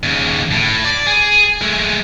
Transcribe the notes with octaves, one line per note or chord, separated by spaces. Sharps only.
D#2 C#3
A2
D5
G#4
G#3 A3